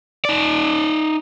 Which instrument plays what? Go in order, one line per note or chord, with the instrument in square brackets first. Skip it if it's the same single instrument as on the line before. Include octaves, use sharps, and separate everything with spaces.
[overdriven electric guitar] D#4 D5